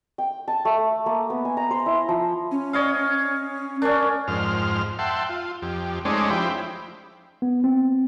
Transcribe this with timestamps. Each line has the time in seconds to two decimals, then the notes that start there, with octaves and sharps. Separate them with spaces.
0.18 G5
0.48 A5
0.65 A3
1.06 A#3
1.30 B3
1.45 G#5
1.57 A#5
1.71 C5
1.86 E4
2.09 F3
2.51 C#4
2.73 C#5 D#5 F5
3.82 C#4 D4 A#4
4.28 F2 G#2 C5 F6
4.99 E5 F#5 G5 A5 C6
5.29 F4
5.62 F2 G4
6.05 G#3 A3 C#4 D#4 C5 D5
6.30 F3 E4 G4 C5 G5 B5
7.42 B3
7.64 C4